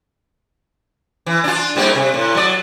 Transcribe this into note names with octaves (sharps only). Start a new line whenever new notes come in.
E3
D4 F4
G#2 G3 A#3
C3
A2
F#3 D5